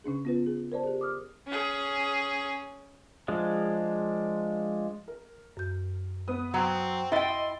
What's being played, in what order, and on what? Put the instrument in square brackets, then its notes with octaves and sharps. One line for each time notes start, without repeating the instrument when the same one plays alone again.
[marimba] C#3 C#4 D4 G#4
B3 F4 B4
G#4
A#4 C5 D5 A5
G4 G#4
D6 D#6 F6
[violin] C#4 G#4
[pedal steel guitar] F3 G#3 D4
[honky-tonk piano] A#4
[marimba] F#2 G6
[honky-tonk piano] B3 B4 D#6
[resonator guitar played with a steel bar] F#3 [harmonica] C4
[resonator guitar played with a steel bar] E4 G5 [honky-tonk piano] D#5 A6 [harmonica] C6